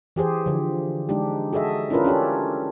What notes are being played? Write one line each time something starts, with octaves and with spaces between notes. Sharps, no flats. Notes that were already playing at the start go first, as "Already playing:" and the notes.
E3 G4 G#4 C5
D3 F3
G#3 D4 D#4 G4
F#4 G#4 A4 D#5 E5
C#4 D4 E4 F4 A#4 B4
C#4 D4 G4 A4